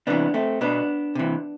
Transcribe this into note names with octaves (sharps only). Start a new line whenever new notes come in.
C3 E3 B3 D4
A3 C4
B2 B3 D4
C3 E3